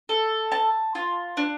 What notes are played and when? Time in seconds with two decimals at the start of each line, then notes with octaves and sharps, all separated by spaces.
0.09 A4
0.52 A5
0.95 F4
1.37 D4